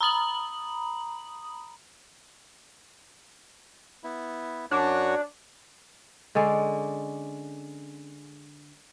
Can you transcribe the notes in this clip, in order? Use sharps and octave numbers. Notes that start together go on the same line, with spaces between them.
A#5 B5 D#6 F#7
B3 E4
F#2 D4 F#4 C#5
D3 G#3 C#4 D5